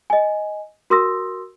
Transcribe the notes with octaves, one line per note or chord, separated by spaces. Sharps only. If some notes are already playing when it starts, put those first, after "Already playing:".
D#5 G#5
F#4 A#4 C6 D#6 E6 A#6